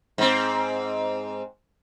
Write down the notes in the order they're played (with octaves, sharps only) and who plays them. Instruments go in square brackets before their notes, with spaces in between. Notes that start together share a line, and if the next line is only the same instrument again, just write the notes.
[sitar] G#2 C4